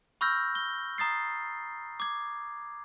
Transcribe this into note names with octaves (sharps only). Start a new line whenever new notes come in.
B5 C#6 E6 F6 G6 A#6
G7
A#5 D#6 A6 C7
D6 G#6